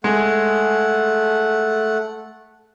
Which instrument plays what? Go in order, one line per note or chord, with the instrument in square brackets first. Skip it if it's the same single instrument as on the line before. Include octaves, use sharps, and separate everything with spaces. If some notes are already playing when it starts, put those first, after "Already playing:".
[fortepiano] G#3 [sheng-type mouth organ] A3 F#5